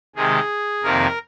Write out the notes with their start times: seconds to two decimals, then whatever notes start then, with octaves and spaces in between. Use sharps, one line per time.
0.16 C3 D#3 G#3 G#4
0.83 F2 C3 D#3 A#3 D#4 A#4